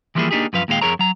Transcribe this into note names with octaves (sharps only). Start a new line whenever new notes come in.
E3 F3 G3 A#3 E4 G#4
A#3 D4 D#4 G4 G#4
F#2 F3 B4 F5
D#2 A#2 G#3 E4 F5 G5
F2 G#4 A#4 C#5 A#5
F#3 A#5